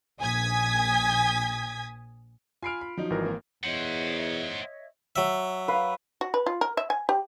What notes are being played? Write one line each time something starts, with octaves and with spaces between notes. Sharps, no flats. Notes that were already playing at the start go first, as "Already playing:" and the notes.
A#1 G#5 D#6 G#6 B6
F4 G#5 B5 F6 C7 D7
B5
F3 F#3 D#4
G#1 E3 A#4
A#3
E2 C5 C#5 D#5 E5 F#5
F#3 E5
B4 F5
F#4
B4
F4
A#4
E5
G#5
G4